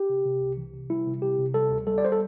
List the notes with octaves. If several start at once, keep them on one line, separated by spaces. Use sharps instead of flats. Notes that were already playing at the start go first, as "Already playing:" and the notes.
Already playing: G4
C3
C3
C2
E3
C3
G3 E4
C3
C3 G4
C3
G3 A4
D2
G3 A4
D5
C5
A4